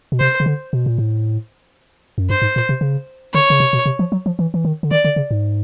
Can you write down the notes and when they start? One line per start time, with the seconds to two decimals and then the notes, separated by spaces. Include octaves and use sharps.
0.12 B2
0.20 C3 C5
0.40 C#3
0.46 D3
0.73 B2
0.86 A#2
0.98 A2
2.18 F#2
2.30 G2 C5
2.42 G#2
2.56 A#2
2.69 C3
2.81 C#3
3.34 D3 C#5
3.50 C#3
3.60 C3
3.73 B2
3.86 C3
3.99 F3
4.12 F#3
4.26 F3
4.39 E3
4.54 E3
4.65 D#3
4.83 D3
4.91 D#3 D5
5.05 D3
5.16 C#3
5.31 G#2